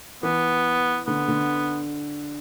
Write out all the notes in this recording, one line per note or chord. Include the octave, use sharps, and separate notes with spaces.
E3 B3
D3 B3
D3